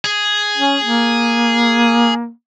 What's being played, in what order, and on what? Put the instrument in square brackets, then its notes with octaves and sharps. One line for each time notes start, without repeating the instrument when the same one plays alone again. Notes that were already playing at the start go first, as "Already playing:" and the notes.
[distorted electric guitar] G#4
[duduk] C#4
A#3